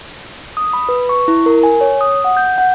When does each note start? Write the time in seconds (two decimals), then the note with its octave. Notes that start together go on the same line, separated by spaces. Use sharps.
0.57 D#6
0.73 B5
0.89 B4
1.09 C#6
1.28 E4
1.46 A#4
1.63 G#5
1.81 C#5
2.01 D#6
2.24 F#5
2.37 G6
2.58 F#5